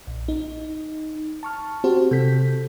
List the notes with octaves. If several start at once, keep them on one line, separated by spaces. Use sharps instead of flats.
A#1
D#4
A5 C#6 F6
C4 F#4 G4 C5
C3 A4 G6 B6